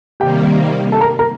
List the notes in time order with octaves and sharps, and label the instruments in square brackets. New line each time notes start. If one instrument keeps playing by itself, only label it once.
[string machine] C3 D#3 G3 A#3 [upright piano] G4 G5
[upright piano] A4 A5
A#4 A#5
A#4 A#5